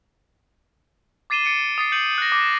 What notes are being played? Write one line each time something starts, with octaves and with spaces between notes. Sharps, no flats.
D6 A6 C7 D#7 E7 G7
A6 C#7 D7 E7
D#6 A6 C7 C#7
G6 C#7 D#7 F#7
F#6 A#6
D6